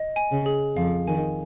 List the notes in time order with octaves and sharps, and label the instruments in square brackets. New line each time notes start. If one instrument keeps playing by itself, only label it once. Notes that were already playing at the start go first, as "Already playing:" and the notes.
Already playing: [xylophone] D#5
G#5
[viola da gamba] C#3
[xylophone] G#4
[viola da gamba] F2 F3 [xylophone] F5
[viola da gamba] D#3 [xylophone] G#5